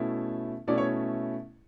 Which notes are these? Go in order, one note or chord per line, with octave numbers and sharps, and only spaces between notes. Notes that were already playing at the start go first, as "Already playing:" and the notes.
Already playing: B2 A3 C#4 E4
B2 A3 C#4 E4 D5
C#5